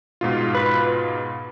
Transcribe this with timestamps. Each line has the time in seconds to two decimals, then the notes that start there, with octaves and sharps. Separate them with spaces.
0.21 G#2 B2 F4
0.55 B4